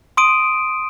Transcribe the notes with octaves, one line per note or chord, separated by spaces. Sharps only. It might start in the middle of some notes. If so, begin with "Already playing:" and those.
C6 D#6 D7 D#7